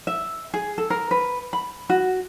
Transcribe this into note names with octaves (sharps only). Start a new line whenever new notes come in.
E5
G#4
A4
A#4
B4
B5
F#4